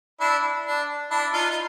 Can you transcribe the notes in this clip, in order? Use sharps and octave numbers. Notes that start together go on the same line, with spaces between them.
D4 E4
D4
D4 E4
D#4 F4
F4